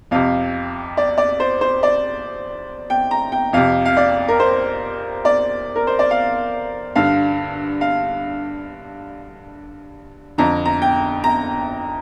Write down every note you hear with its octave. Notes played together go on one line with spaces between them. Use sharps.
F2 C3 F5
D5
D5
C5
C5
D5
G5
A#5
G5
F2 C3 F5
F5
D5
A#4
C5
D5
A#4
C5
D5
F5
G2 D3 F5
F5
F2 D3 A#5
A#5
G5
A#5